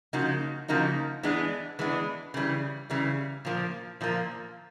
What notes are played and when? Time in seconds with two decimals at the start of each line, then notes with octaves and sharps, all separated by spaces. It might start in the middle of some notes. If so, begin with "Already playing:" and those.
0.13 C#3 F3 A#3 D#4 F#4
0.68 C#3 F3 A#3 D#4 F#4
1.23 E3 G#3 B3 D4
1.79 E3 G#3 B3 D4
2.34 C#3 E3 G3
2.90 C#3 E3 G3
3.45 A#2 F3 A#3
4.01 A#2 F3 A#3